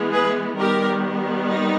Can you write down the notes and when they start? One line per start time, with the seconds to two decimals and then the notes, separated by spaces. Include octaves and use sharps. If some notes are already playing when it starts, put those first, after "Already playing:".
Already playing: E3 G#3 B3
0.12 G#4 B4
0.57 D#3 G3 B3 G4 A#4
1.48 D#4